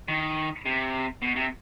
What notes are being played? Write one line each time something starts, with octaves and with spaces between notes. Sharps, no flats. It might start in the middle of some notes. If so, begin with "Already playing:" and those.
D#3
C3
B2
C3